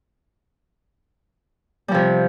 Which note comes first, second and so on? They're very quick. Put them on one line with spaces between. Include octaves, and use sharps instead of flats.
G3 F3 C3